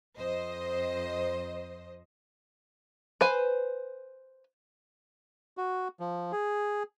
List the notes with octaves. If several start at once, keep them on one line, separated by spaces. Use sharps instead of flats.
F2 C5 D#5
B4 C5 G#5
F#4
F3
G#4